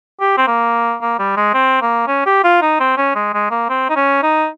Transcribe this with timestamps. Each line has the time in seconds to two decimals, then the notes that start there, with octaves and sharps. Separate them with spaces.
0.20 G4
0.38 C4
0.47 A#3
1.02 A#3
1.19 G3
1.37 G#3
1.54 C4
1.82 A#3
2.07 C#4
2.26 G4
2.44 F4
2.62 D#4
2.80 C4
2.97 C#4
3.15 G#3
3.34 G#3
3.50 A#3
3.69 C4
3.89 D#4
3.96 C#4
4.23 D#4